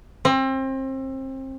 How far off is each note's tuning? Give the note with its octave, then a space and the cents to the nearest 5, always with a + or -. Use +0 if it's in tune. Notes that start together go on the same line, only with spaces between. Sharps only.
C4 +30